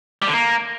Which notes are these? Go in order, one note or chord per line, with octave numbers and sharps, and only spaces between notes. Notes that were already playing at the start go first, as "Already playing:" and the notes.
G3
D3
A#3